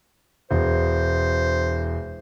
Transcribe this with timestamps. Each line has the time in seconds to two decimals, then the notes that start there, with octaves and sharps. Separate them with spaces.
0.51 E1 C5